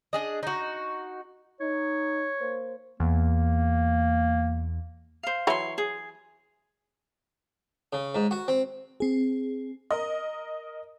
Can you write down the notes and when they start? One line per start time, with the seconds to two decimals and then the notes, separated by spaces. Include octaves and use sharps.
0.13 D4 G#4 D#5
0.43 D#4 F#4
1.60 D#4 C#5
2.40 A#3 C5
3.00 E2 A#3
5.23 C5 F5
5.47 E3 F#3 E4 C#5 C6
5.78 G#4
7.93 C#3
8.15 G#2
8.31 F#4
8.48 C4
9.00 C4 G#4
9.91 A#4 D#5